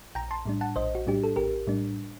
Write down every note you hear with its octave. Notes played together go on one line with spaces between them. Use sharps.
A#1 G5 A#5
A5 C6
A2 G3 D4
F#5 A5
A#1 C5 D#5
F#4
A2 G3 D4 G4
A4
A#1 G4 A#4
A2 G3 D4